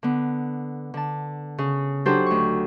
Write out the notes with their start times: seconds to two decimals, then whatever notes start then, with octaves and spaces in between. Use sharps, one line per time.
0.03 D3 B3
0.94 D3 A5
1.58 C#3
2.05 F#3 D4 D#4 G4 A4 C5
2.26 D2 C#6